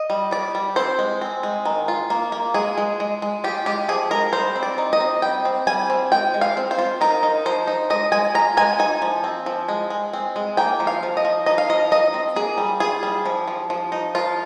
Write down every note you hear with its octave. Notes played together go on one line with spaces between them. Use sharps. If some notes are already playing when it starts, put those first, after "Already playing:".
Already playing: D#5
G3
G3 D5
G3
C4 C5
G#3
C4
G#3
D#3
F4
A#3
A#3
G#3 G#4
G#3
G#3
G#3
F4 G4
G#3 G4
F3 G#4
G#3 A#4
G3 C5
C4
D5
D#4
D#5
C4
G3 G5
C4
G3 G#5
C4
G#3 G5
G#3
F5
C4
C5
F4
D#4 A#4
D#4
F3 C5
D#4
G#3 D#5
G#3 G#5
F4 A#5
G#3 G#5
D#4 G#5
F3
C4
F3
G#3
G#3
C4
G#3
A#3 G5
F3
F5
F3
D#5
F3
D#4 D#5
F5
F3 D#5
D#4 D#5
C4
A#3 G#4
G3
F4 G#4
G3
F3
F3
F3
D#4
F3 F4